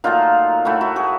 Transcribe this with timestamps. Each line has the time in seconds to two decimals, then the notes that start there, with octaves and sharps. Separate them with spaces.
0.04 A#2 F#3 A3 D#4 F4
0.65 A2 F#3 A3 E4 F#4
0.81 E4 F#4
0.96 F#4 G#4